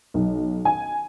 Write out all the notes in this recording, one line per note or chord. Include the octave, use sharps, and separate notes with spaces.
B1
G#5